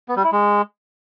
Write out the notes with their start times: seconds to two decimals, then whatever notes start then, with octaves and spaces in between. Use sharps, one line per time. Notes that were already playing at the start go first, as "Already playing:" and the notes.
0.08 B3
0.16 G3
0.24 E4
0.32 G#3